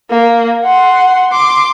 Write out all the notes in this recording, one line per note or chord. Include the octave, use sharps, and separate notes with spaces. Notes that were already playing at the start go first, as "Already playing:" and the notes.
A#3
F#5 C6
C6 D6